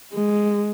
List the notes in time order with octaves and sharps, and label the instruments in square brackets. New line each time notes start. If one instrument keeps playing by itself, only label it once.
[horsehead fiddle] G#3